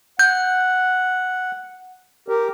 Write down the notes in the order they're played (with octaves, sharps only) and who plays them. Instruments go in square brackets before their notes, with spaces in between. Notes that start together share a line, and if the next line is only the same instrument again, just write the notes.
[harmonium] F#5 [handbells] G6
[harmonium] G4 A#4